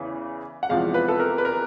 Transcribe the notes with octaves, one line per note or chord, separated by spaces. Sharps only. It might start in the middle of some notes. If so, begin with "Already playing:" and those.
Already playing: E2 C#3 E3
F#5
E2 C3 F3 G#3 F5
B4
A4
A#4
B4
A#4